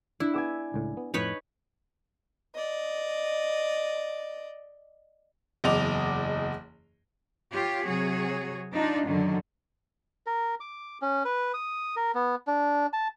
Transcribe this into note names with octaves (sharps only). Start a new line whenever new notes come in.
D4 E4
B3 G#4 F#5 G#5 D6 E6
C#2 A2
B3
F2 A2 D#4 B4 C#5
D5 D#5
F#1 E2 D#5 D6 F7
F4 G4 C#5
C3 F#3 F#4 G#4 C#5
D4 D#4 F4
F#2 D3 D#3 F#3
A#4
D6
C#4
B4
D#6
A#4
B3
D4
A5